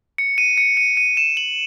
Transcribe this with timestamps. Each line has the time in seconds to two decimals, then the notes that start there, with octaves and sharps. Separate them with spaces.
0.18 C#7
0.38 D#7
0.58 C#7
0.77 D#7
0.97 D#7
1.17 E7
1.37 F#7